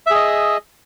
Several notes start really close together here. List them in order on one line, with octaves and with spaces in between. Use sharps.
E5 G#4 D#5